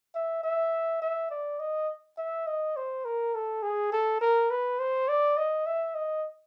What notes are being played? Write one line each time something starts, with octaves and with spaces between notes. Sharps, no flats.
E5
E5
E5
D5
D#5
E5
D#5
C5
A#4
A4
G#4
A4
A#4
B4
C5
D5
D#5
E5
D#5